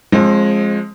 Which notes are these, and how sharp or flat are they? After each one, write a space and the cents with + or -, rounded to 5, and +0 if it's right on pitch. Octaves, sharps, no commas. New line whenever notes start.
F3 +0 G#3 +0 C4 +35